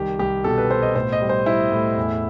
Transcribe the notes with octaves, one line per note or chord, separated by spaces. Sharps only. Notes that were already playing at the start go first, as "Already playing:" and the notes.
Already playing: C2 D#3 G4
C2 G4
B2 A4
B4
B2 C5
D#5
A2 C5
D#5
G3
C5
G3 E4
A2
E2